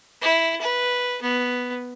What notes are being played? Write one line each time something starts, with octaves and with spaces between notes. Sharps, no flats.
E4
B4
B3